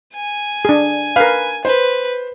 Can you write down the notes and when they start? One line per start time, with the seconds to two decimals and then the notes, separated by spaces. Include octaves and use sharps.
0.14 G#5
0.65 D4 G#4
1.16 A#4 B4 F5
1.65 B4 C5